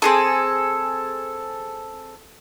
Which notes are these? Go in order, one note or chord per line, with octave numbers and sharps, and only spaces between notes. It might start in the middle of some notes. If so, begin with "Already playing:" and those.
C4 G#4 A4